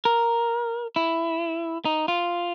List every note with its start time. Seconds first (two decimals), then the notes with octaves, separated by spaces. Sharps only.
0.05 A#4
0.96 E4
1.85 D#4
2.08 F4